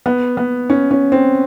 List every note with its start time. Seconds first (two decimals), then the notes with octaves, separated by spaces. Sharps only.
0.06 B3
0.37 B3
0.70 C#4
0.91 C#4
1.12 C4